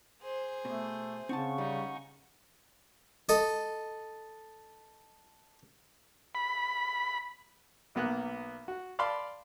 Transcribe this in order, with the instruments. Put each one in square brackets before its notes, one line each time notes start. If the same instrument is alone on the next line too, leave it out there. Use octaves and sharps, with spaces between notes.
[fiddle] G#4 C5
[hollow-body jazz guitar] B2 [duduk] A3
[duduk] C#3 [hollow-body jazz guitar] C4 D#4 A5 [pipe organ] C#4 F#5 C#6
[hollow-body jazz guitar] G3 [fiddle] D#4
[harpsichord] A4 D#5
[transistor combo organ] B5
[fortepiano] B1 A#3 B3 B4 F#6
F#4
D5 F5 A5 B5 C6